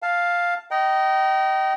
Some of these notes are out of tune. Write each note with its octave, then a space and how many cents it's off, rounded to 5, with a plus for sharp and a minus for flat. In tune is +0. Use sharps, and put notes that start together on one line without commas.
F5 +5 A5 +0
D#5 +0 G5 -30 A#5 +30